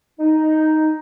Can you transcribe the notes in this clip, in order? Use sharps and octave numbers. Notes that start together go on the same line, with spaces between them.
D#4